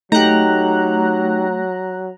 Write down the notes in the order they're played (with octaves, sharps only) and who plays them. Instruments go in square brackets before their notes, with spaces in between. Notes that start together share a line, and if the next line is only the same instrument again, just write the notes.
[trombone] F#3 [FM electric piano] A3 [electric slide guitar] D#4 G4 [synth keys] A#5 F#6